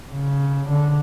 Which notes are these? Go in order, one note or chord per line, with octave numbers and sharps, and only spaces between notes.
C#3
D3